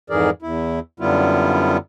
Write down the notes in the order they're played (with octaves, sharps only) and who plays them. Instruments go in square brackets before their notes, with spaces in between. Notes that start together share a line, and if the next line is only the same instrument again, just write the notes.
[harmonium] F2 G#2 E3 G#4 A#4 D5
E2 E4
F#2 D3 G3 B3 E4 F4